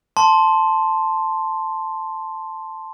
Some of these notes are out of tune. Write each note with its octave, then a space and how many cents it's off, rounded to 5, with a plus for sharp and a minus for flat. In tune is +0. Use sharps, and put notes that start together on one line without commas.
A5 +0 C6 +0